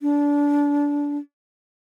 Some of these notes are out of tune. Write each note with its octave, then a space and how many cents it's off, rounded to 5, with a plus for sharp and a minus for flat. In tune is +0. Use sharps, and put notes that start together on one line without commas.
D4 -25